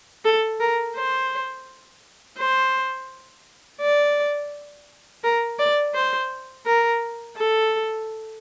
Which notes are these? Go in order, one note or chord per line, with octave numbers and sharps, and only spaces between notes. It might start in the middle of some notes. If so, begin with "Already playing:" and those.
A4
A#4
C5
C5
D5
A#4
D5
C5
A#4
A4